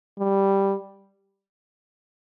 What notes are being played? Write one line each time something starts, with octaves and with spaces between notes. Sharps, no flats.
G3